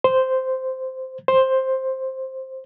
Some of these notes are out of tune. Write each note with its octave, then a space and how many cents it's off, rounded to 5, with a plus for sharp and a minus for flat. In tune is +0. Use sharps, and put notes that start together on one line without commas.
C5 -5
C5 +10